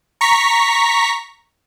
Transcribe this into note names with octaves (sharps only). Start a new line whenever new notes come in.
A#5 C#6 B6